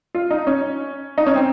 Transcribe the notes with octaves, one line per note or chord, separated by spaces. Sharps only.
F4
D#4
C#4
D#4
C#4
C4